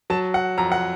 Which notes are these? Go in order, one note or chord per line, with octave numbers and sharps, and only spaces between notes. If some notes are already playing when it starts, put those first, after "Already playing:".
F#3 A5
F#5
F2 A#5
F#5